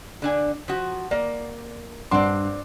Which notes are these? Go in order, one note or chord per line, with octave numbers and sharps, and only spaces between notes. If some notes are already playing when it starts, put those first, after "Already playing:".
D3 D4 G#5
F3 F#4
A#3 D5
G2 C4 D4 F#5 C6